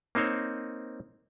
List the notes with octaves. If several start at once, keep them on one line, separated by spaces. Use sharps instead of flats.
A#3 C4 D#4 C5 C#5